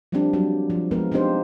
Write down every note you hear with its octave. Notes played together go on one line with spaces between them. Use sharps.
F3 G3 A#3 C4 D4 G4
F#3 G3
F3
F3 G#3 A#3 B3 A#4
A#3 C4 D4 D#4 G4 C5